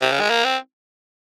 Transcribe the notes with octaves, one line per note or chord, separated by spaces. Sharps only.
C3
C#3
G#3
A#3
C4